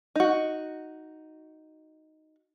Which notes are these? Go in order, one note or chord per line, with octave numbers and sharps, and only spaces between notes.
D#4 F#4